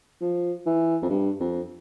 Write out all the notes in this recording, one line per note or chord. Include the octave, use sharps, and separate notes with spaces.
F3
E3
F2
G2
F2